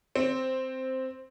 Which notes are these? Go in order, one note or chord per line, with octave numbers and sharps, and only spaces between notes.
C4